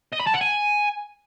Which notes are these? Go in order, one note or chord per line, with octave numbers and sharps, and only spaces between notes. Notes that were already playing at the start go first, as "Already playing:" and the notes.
D#5
B5
A5
F#5
G#5